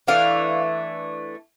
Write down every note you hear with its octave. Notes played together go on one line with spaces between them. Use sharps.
E3 A3 D4 F5